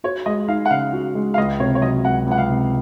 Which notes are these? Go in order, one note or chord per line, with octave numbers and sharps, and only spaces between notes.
F#4 C#5
G#3 D#5
D#4 F5
F#5
C#3 F5
F#4
G#3
F5
C#2 D#5
C3 C#5
C#5
F#3 D#5
C#2 F#5
C#2 F#5
F5
C3